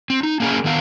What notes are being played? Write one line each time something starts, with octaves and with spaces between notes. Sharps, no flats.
C4
D#4
A#3 C#4 G#4 A#4 A#5
D#3 B3 A#4 F5